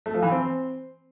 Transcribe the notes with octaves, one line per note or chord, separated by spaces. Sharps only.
A3
F3
E3
C4